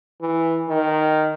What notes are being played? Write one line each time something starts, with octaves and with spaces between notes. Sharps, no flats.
E3
D#3